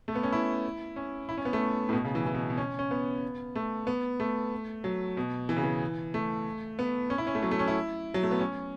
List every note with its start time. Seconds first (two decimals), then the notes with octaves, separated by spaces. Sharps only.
0.08 A3
0.15 B3
0.23 C#4
0.32 E4
0.96 C#4
1.29 E4
1.37 C#4
1.45 B3
1.53 A3
1.89 A2
1.93 B2
2.04 C#3
2.15 E3
2.26 E3
2.34 B2
2.50 B2
2.57 C#4
2.79 C#4
2.91 B3
3.56 A3
3.87 B3
4.20 A3
4.84 F#3
5.17 B2
5.49 E3
5.57 C#3
5.63 E3
6.14 A3
6.79 B3
7.10 C#4
7.18 E4
7.27 C#4
7.35 A3
7.43 F#3
7.51 A3
7.59 C#4
7.68 E4
8.14 F#3
8.23 A3
8.31 B3
8.39 C#4